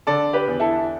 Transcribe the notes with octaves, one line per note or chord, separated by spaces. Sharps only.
D3 A4 D5
G4 B4
E2
E4 A4